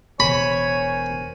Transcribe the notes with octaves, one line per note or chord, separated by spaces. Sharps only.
E1 E2 A#4 C5 C#5 G#5 B5